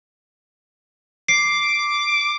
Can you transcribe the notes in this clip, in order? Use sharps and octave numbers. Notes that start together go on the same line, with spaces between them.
D6 C7